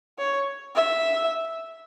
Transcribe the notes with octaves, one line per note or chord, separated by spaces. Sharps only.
C#5
E5